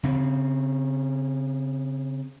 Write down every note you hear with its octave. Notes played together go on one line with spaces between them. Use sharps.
C#3 C4